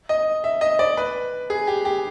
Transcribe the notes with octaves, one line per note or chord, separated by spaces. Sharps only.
D#5
E5
D#5
D5
B4
G#4
G4
G4